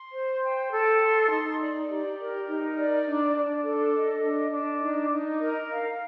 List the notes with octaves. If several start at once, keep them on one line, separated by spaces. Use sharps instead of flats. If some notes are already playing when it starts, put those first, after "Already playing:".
Already playing: C6
C5
G5
A4
C6
D#4
D5
G4
A#4
D#4
D5
D4
D4
A4
D#5
D4
D4
D#4
D#4
A#4
F5